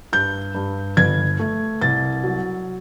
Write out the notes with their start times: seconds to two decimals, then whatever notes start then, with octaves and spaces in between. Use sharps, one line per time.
0.13 G2 G6
0.55 G2
0.97 G1 G#6
1.39 A3
1.81 C2 A6
2.24 F#3